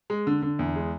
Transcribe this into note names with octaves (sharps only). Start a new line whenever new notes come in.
G#3
D3
D3
E2
G#3